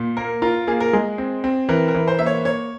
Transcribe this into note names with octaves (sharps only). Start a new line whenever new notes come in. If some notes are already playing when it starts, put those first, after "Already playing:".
Already playing: A#2
A#3 A#4
F4 A#4
A#3 G#4
A#4
G#3 G#4
C4
C4
E3 A#4
A#4
E3
C5
A#3 E5
C#5
A#3 C#5